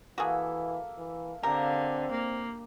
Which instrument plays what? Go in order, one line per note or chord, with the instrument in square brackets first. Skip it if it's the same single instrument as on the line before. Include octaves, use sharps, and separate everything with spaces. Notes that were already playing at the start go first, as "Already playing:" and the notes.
[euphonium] E3 [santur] A#3 A4 E5 [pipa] F#4 G#4
[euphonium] E3
[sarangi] D3 [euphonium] C4 [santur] G4 E5 F5 [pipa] A#4
[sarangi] A#3